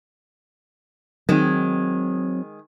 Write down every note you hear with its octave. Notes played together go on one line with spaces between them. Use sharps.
D#3 F#3 G#3 C4